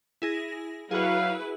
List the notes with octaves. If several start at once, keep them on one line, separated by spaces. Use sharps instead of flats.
E4 G#4 A#6
F#3 E4 F#4 G#4 B4 F5